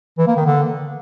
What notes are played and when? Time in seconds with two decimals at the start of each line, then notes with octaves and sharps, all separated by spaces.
0.18 E3
0.27 A#3
0.36 D#3
0.46 D3